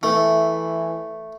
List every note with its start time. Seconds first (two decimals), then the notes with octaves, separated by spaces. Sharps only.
0.03 E3 A3